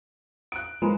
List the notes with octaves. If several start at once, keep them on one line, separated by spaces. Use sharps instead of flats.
F#6 D7
F3 G#3 A#4 B4